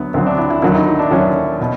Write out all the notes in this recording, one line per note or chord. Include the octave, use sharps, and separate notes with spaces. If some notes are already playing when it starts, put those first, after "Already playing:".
Already playing: D2 D3 F#3 B3
D2 D3 F#3 C4
D4
E4
E4
D#2 D3 F#3 E4
D#4
D#4
D4
D#2 D3 F#3 C#4
B2